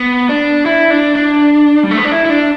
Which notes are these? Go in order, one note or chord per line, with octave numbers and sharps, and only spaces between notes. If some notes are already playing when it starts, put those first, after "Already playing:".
Already playing: B3
D4
E4
D4
D4
G3
A3
B3
D4
E4
E4
D4